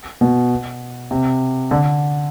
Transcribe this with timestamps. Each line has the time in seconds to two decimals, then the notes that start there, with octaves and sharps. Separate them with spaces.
0.21 B2
1.11 C3
1.71 D3